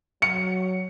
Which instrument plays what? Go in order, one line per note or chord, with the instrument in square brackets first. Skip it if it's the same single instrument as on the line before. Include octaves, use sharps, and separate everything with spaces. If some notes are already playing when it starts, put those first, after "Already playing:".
[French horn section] F#3 [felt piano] C#7